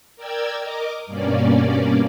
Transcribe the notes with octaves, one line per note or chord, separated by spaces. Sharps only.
A#4 D5 G5 E6 G#6
A#4 D#5 D6
G2 B2 A#3 C#4 D5